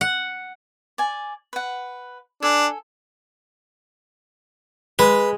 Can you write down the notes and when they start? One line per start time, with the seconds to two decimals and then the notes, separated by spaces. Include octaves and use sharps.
0.01 F#5
0.98 D5 G#5
1.53 B4 F#5
2.43 D4 A4 G#5
4.99 G#3 B4